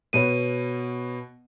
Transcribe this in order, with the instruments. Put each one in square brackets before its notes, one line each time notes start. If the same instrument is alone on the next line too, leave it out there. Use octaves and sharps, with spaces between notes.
[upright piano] B2 B3 [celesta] C#5 D#7